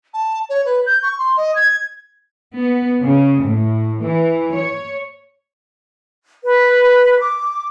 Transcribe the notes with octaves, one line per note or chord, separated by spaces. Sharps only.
A5
C#5
B4
G6
C#6
C6
D#5
G#6
B3
C#3
A2
E3
C#5
B4
D6